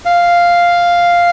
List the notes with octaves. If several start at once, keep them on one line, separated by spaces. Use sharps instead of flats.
F5